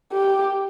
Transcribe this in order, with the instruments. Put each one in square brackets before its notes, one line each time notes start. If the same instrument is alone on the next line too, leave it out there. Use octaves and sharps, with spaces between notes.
[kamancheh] G4